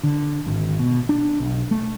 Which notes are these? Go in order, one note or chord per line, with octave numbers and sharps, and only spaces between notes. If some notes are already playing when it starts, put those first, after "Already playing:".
D3
G#1
B2
D4
B1
A3